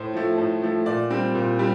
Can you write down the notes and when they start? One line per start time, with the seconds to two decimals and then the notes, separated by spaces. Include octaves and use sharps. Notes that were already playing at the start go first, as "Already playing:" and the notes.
Already playing: A2 C5
0.13 F3 A3
0.38 A2
0.62 F3 A3
0.86 A#2 D5
1.11 G3 C4
1.35 A#2
1.59 G3 C4